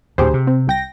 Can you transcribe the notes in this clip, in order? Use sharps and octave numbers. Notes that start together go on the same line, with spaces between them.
D2 A2 G4 G#4 C5
C3
C4
C2 G5 A#6